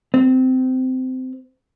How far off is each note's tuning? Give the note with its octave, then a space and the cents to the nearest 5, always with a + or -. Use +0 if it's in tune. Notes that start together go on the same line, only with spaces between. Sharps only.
C4 -20